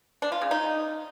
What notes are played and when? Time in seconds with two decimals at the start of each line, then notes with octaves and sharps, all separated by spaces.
0.22 D4
0.32 F4
0.41 C#3
0.51 D#4